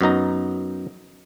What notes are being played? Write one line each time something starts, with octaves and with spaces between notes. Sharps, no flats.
F#2 B3 D#4 A#5